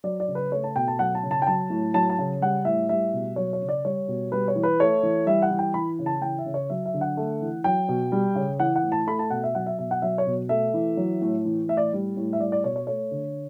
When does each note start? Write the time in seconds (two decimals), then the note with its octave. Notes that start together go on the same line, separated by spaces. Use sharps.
0.04 F#3 D5
0.20 D5
0.28 C#3
0.35 B4
0.52 A3 C#5
0.64 A5
0.76 B2 G5
0.88 A5
0.99 F#3 F#5
1.15 A5
1.23 C#3
1.31 A5
1.42 G5
1.47 F#3 A5
1.70 A2
1.94 F#3 A5
2.10 A5
2.18 C#3
2.41 G3 F#5
2.65 A2 E5
2.89 G3 E5
3.13 B2
3.36 F#3 C#5
3.53 C#5
3.61 C#3
3.69 D5
3.85 G3 C#5
4.08 B2
4.32 G3 B4
4.48 C#5
4.56 E3
4.63 B4
4.80 A3 C#5
5.03 E3
5.26 G3 E5
5.42 F#5
5.51 E3
5.59 G5
5.74 E3 B5
5.99 C#3
6.06 A5
6.22 E3 G5
6.39 E5
6.46 C#3
6.54 C#5
6.70 F#3 E5
6.86 E5
6.94 D3
7.01 F#5
7.17 A3
7.42 E3
7.64 F#3 G5
7.89 B2
8.12 G3
8.36 C#3
8.60 E3 F#5
8.76 F#5
8.83 A2
8.92 A5
9.07 A3 B5
9.19 A5
9.30 B2 F#5
9.44 E5
9.55 F#3 F#5
9.66 E5
9.78 B2 E5
9.91 F#5
10.02 F#3 E5
10.18 C#5
10.27 B2
10.49 A3 E5
10.74 E3
10.97 F#3
11.22 A2
11.45 E3
11.68 A2 E5
11.77 D5
11.93 G3
12.17 A2
12.33 E5
12.40 G3 D5
12.52 D5
12.64 B2 C#5
12.76 C#5
12.87 A3 C#5
13.11 D3